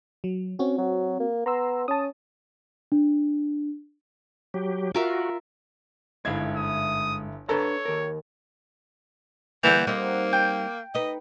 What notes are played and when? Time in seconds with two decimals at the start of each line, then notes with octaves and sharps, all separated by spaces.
0.24 F#3
0.59 C4 C#4 F#4
0.78 F#3
1.20 A#3
1.46 B3 A#5 C6 E6
1.88 C#4 A5 D#6
2.92 D4
4.54 F#3 G4
4.95 F4 F#4 A#4 E5
6.25 G1 G#2 E4 E5 F5 G#6
6.56 D#6
7.49 D4 A4 B4 C#5 A#5
7.85 D#2 A#4
9.63 D3 E3 G3 A#3 F#5 G6
9.87 G3 A#3 C4 D#4
10.33 G5
10.95 D#4 B4 D#5